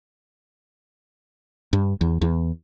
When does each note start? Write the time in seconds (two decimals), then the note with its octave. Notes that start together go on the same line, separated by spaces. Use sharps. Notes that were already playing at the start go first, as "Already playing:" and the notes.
1.73 G2
2.01 E2
2.22 E2